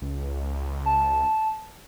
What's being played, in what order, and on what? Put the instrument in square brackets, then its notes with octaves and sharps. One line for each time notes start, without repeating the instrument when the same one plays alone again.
[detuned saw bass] C#2
[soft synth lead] A5